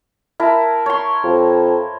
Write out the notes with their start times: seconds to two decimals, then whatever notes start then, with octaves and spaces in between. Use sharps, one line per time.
0.40 E4 A#4 A5
0.86 C#5 C6
1.24 F2